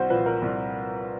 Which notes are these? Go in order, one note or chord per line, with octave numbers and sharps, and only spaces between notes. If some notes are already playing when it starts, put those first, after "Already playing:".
Already playing: C2 F#4 C5
A#2 F3 B4
A#4
C2